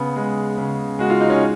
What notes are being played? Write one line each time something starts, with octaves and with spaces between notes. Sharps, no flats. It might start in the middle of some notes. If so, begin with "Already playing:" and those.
Already playing: C#3 B3
G#3
C#3
G#3 F#4
F4
D#4
C#4